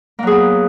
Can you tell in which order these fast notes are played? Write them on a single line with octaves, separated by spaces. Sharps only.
A#3 F#3 G#4 B3